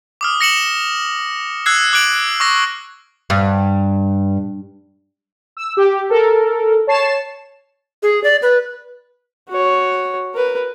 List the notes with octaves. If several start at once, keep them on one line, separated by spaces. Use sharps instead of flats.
D6 D#6 F6
A#6 C#7 E7 F#7
E6 F#6 G#6 C7
D6 F#6 G#6 D7 F#7
C#6 D6 E6 A#6
G2
E6
G4
A4 A#4
C#5 A5 C7 E7
G#4
D5
B4
F#4 C#5
A#4 B4